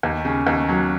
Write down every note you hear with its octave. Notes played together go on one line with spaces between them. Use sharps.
D#2
C#3
D#2
F#3